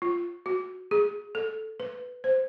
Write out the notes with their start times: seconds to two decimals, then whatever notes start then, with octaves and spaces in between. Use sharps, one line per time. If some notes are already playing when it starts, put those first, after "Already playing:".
0.02 F4
0.46 F#4
0.91 G#4
1.35 A4
1.80 B4
2.24 C5